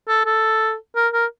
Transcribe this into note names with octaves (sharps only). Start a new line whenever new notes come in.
A4
A4
A#4
A#4